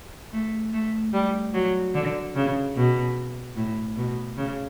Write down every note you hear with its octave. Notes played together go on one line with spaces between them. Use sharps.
A3
A3
G3
F#3
D3
C#3
B2
A2
B2
C#3